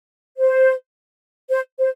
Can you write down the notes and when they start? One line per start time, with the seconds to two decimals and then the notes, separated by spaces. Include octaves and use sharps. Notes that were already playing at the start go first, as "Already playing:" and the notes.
0.38 C5
1.50 C5
1.79 C5